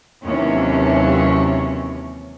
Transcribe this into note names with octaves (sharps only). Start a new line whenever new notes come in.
D#2 C3 E3 F#3 C#4 C#5